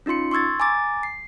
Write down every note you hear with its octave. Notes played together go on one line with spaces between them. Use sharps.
C#4 D#4 F4 C6 C#7
C6 C#6 E6 G#6 A6
G#5 A#5 D6 A6
C7